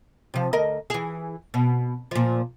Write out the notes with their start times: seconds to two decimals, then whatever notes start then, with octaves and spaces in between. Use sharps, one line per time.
0.34 C3 F3
0.53 D2 A#4 D#5
0.90 E3 G#4
1.54 B2
2.11 A#2 F3